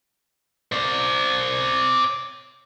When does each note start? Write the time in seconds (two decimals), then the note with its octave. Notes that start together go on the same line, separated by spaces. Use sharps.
0.72 C5 D5